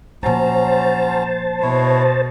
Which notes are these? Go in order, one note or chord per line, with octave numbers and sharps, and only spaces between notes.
A#2 F3 F#3 C#4 C5 A5 A#5
B2 E4 C#5